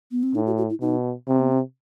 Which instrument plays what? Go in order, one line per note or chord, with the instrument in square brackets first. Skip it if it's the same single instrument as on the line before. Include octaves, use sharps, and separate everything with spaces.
[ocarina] B3
C4
[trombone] A2 [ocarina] D#4
[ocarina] F#4
F#4
E4
[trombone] B2 [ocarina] D#4
[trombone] C3 [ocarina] C4
[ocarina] B3
C4